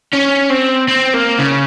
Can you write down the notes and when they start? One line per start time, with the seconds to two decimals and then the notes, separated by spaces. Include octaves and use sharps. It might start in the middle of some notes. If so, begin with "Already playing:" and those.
0.13 C#4
0.50 C4
0.88 C4
1.14 A#3
1.39 C#3